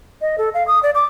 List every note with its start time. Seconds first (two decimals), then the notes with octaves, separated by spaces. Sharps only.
0.21 D#5
0.38 A4
0.54 F5
0.67 D#6
0.83 D5
0.95 D6